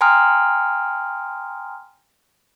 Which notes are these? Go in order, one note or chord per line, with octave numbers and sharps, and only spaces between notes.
G5 G#5 A#5 C6 D#6 F6